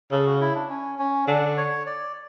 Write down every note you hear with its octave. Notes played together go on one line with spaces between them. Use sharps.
C#3 A4
F#4
E4
D4
C#4
C#4
D3 D4
C#5
D5